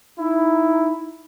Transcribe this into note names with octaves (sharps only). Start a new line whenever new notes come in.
D#4 E4